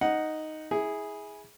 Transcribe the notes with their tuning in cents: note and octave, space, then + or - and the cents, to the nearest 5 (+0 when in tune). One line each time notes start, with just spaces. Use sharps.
D#4 +0 F#5 +0
E4 -20 G#4 +0